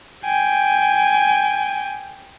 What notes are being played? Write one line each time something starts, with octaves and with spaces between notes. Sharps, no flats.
G5 G#5